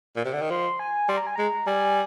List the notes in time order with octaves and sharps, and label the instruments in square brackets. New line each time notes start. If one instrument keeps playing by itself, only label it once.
[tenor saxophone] A#2
C3
D3
D#3
[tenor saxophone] F3 [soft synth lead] C6
[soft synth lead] G#5
[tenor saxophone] G3 [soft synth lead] C6
[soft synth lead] A#5
G#5
[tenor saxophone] G#3 [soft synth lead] A#5
[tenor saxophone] G3 [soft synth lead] G#5